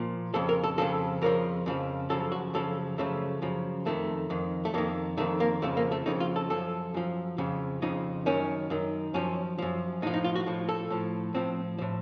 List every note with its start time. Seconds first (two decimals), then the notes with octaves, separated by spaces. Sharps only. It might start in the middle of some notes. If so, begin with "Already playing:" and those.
Already playing: A#2 F3
0.34 F2 C#3 F3 A4
0.49 A#4
0.64 A4
0.78 F2 C#3 F3 A4
1.21 F2 C#3 F3 A#4
1.66 F2 C#3 F3
2.10 F#2 C#3 F3 A4
2.32 F#4
2.54 F#2 C#3 F3 A4
2.98 F#2 C#3 F3 A3
3.42 F#2 C#3 F3
3.86 F2 D#3 A3
4.30 F2 D#3
4.65 A3
4.74 F2 D#3 A#3
5.17 F2 D#3 A3
5.40 A#3
5.62 F2 C#3 F3 A3
5.77 A#3
5.91 A3
6.06 F2 C#3 F3 D#4
6.20 F4
6.36 A4
6.50 F#2 F3 A4
6.94 F#2 F3
7.38 F2 C#3 F3
7.82 F2 C#3 F3 D#4
8.26 F#2 D#3 C#4
8.70 F#2 D#3
9.14 F#2 F3 C#4
9.58 F#2 F3
10.02 A2 D#4
10.07 F3
10.14 D#4
10.24 F4
10.35 F#4
10.46 A2 F3
10.69 A4
10.90 A2 F3
11.34 A2 F3 C4
11.78 A2 F3